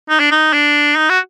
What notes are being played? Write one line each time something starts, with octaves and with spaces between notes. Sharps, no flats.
D#4
D4
D#4
D4
D#4
F#4